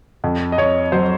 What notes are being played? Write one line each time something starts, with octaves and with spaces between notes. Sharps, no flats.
F2
D#5
F2 C#5
F#3 C5